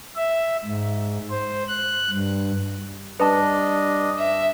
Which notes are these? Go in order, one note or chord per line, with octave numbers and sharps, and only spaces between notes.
E5
G#2
C5
F#6
G2
G2 D4 B4 D#5 A5
E5